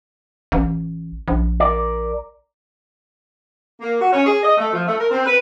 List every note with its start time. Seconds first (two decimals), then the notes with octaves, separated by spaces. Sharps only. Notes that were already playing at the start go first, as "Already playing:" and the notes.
0.52 A1
1.28 A#1
1.60 A#4 D5
3.81 A#3
4.00 F#4
4.12 C#4
4.25 G#4
4.43 D#5
4.58 A3
4.73 F3
4.87 A3
4.99 A#4
5.11 C4
5.25 B4